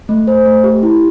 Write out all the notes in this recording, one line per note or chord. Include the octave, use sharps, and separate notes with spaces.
A3
C5
A3
G4
E4